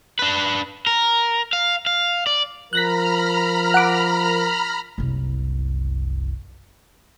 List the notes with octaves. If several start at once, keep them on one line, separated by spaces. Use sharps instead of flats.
D4 B4
A#4
F5
F5
D5
F3 A#4 A#5 B5 F6 F#6 A#6 B6
F#5 D6
F#1 C2